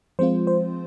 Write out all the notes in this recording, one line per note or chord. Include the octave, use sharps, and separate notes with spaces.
F3 G#3 C4 F4 C5
C5